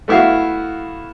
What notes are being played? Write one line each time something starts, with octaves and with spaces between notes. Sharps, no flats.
A3 B3 E4 F#4 F5